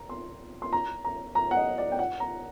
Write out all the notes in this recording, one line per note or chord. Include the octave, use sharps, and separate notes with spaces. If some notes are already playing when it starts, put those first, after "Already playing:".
Already playing: A#5
C6
C6
A#5
A#5
A#5
F#5
D#5
D5
G5
F#5
A#5